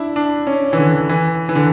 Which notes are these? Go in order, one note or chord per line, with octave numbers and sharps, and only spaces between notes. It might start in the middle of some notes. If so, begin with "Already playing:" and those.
Already playing: D4 E4
D4
C#4
E3
D3
E3
E3
D3